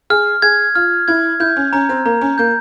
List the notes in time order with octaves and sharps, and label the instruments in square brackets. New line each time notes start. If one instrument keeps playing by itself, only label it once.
[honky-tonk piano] G#4 [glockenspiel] F6
[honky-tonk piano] G#4 [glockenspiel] G#6
[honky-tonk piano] F4 [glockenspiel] F6
[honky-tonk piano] E4 [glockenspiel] G#6
[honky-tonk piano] E4 [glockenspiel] G6
[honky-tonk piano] C#4
[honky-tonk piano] C#4 [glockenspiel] A#5
[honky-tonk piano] C4
[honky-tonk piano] A#3 [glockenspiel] A#5
[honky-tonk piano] C#4
[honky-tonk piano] A#3 [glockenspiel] G6